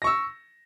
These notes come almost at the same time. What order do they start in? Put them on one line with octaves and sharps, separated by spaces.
A#6 C#6 E6